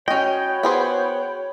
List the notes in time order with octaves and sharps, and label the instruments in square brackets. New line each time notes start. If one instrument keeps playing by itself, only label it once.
[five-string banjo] C#4 D#5 [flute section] F#4 C#5 B5 [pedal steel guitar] G5
[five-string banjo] B3 G#4 C5